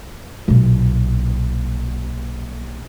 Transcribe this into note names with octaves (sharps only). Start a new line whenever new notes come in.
B1 A#2